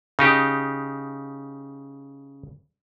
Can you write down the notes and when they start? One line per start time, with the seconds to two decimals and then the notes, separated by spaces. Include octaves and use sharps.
0.19 C#3 D#4 G4